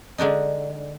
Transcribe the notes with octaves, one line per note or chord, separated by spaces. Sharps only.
D3 G#3 D4 D#4